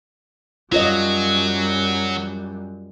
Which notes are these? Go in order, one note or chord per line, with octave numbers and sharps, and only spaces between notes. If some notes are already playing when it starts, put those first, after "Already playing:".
F#2 F#3 G3 F4 C#5 D#5